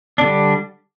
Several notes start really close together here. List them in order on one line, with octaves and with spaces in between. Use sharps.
D4 D3 G3